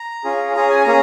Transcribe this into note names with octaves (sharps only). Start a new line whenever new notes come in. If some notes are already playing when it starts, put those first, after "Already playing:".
Already playing: A#5
C#4 F4 G#4
C#4 G#4 A#5
G#5
A#3 C#4 G#4 A#5